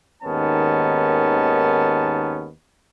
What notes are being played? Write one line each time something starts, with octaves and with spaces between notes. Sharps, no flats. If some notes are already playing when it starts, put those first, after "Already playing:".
D#2 G#2 D#3 B3 C#4 A5